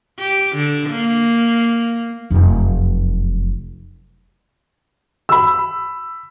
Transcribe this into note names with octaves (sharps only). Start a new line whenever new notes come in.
G4
D3
A#3
F1 F#2
B5 E6